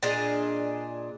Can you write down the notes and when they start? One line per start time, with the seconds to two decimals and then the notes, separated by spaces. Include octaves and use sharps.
0.03 A#2 D4 G#4 D#5